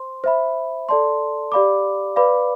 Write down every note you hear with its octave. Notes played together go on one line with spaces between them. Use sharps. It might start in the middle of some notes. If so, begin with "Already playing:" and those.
Already playing: C5 C6
C5 E5 B5
A4 D5 A5 C6
G4 D5 F5 B5 D6
B4 D5 F5 B5 D6